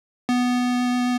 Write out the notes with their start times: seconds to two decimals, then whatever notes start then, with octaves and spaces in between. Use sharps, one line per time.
0.29 B3